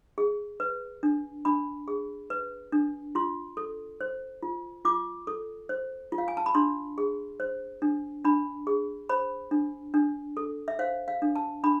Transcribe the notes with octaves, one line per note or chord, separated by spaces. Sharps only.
G#4
B4
D4
D4 B5
G#4
B4
D4
F4 C6
A4
C5
F4
F4 D6
A4
C5
F4
F5
G#5
A5
B5
D4 C6
G#4
C5
D4
D4 B5
G#4
C5 B5
D4
D4
A4
E5
C5 F5
F5
D4
A5
D4 B5